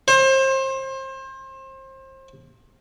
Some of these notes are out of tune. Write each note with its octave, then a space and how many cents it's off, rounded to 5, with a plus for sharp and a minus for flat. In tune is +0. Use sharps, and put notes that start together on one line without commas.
C5 +30